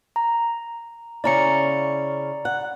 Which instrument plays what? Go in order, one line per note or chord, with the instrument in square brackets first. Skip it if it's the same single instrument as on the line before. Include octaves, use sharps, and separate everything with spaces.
[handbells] A#5
[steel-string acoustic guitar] C#3 C#4 E4 [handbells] D5 A#5 C#7
[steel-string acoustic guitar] F#5